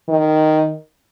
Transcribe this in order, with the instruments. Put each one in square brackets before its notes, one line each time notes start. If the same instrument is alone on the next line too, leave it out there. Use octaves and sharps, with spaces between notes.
[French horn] D#3